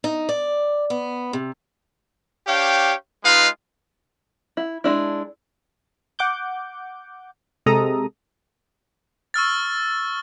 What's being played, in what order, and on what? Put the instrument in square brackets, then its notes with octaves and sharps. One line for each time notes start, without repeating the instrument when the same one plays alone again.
[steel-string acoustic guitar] D#4
D5
B3
C3
[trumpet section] D4 G4 C#5 F5 G5
G#3 D#4 F4 B4 F5
[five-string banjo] E4
G#3 D4 E4
[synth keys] F#5 D6 G6
C3 G#3 A4 A#5 D#6
[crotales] C#6 E6 F6 A6